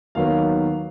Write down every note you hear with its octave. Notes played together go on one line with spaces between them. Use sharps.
D#2 D#3 F#3 B3 F5